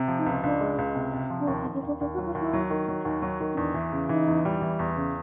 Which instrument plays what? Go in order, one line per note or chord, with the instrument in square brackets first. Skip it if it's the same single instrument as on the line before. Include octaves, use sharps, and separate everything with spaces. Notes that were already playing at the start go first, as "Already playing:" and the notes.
Already playing: [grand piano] C3
F3
[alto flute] D#4
[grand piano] C#2
[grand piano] C#2 [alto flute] D4
[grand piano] G#3
C#2
C3
C3
F3
[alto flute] D4
[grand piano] D#2 [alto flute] C#4
[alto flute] C4
[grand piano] D#2
[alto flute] C#4
[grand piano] D#2 [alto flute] D4
[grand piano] D#2 [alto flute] D4
[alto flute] F#4
[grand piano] F#3
[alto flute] F4
[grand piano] D#2 [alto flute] E4
[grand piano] F#3
D#3
F#3
[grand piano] D#2 [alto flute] D#4
[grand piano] F#3
D#3
[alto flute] C#4
[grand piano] E2 [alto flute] D4
[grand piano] E3
C#3
[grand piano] E3 [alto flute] D#4
[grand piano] E2
G3
E3
E2
C#3